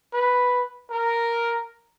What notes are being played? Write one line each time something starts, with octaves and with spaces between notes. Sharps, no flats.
B4
A#4